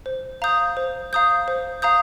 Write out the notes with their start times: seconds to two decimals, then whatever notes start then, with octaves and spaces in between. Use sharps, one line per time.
0.06 C5
0.42 F5 A#5 D#6 G6
0.77 C5
1.13 F5 A#5 D#6 G6
1.48 C5
1.82 F5 A#5 D#6 G6